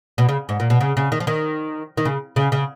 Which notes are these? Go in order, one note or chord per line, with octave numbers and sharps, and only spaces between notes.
B2
C#3
G#2
A#2
B2
C#3
C#3
D#3
F3
D#3
D#3
C#3
C#3
C#3